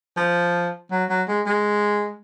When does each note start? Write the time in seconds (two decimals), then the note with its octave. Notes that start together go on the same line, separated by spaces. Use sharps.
0.17 F3
0.91 F#3
1.10 F#3
1.28 G#3
1.46 G#3